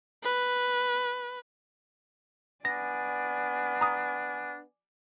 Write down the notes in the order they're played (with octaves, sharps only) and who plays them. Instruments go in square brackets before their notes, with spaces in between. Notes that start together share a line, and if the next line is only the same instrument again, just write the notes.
[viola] B4
[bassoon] B3 [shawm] D4 [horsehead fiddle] D5 G#5 [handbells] A#6
[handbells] A#5 D#6